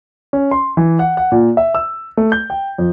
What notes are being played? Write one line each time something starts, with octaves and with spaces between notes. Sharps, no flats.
C#4
C6
E3
F#5
F#5
A#2
E5
E6
A3
G6
G5
F2